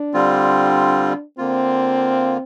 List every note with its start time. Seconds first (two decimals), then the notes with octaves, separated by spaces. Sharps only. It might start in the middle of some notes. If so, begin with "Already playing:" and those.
Already playing: D4
0.14 D3 G3 C4 F4
1.38 D3 A#3 C4 F4